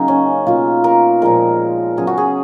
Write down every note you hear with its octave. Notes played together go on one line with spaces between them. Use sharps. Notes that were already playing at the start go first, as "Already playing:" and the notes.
Already playing: C#3 F#3 A#3 D#4 G#4
C#4
B2 A#3 F4
A#4
A#2 F3 G#3 A#4
C#3 F#3 B3 G#4
F#4
G#4